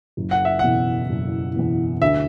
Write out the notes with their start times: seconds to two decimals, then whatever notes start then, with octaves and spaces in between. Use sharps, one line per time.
0.17 F#1
0.31 F#5
0.45 E5
0.59 E2 B2 F#5
1.09 F#1
1.55 E2 B2
2.02 D2 E5